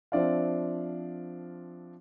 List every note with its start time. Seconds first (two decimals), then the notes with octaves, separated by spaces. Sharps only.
0.12 F3 C4 D4 D5 E5 F5